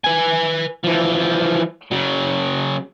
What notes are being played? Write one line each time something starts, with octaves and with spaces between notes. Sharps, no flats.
B4 G#5
E3 F3
C#3 F#3